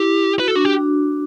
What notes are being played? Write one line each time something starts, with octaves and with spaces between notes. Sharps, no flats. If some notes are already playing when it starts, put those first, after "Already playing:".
Already playing: E4 G4
F#4 B4
A4
D4 F#4
G4